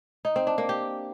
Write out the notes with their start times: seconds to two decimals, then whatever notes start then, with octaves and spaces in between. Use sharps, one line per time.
0.25 D#4
0.36 C4
0.47 D4
0.58 A#3
0.69 G4